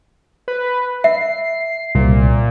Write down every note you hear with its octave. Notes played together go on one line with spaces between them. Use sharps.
B4
E5 C7
C2 A#2